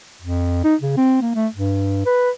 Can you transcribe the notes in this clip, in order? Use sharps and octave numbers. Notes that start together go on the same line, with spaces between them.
F2
D#4
C#3
C4
A#3
A3
G2
B4